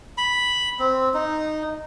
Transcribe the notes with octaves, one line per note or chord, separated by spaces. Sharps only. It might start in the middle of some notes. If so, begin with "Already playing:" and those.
B5
C4
D#4